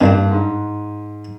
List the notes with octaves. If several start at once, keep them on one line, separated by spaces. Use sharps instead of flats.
G2 D#3 G3 A#3 D4
G#2